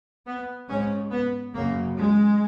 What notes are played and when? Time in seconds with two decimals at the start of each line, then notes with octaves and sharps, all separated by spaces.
0.26 B3
0.68 G#2 C#4
1.11 B3
1.54 F#2 C#3 A#3
1.96 G#3